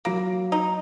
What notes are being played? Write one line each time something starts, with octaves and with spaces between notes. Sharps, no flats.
F#3 A#3
D#4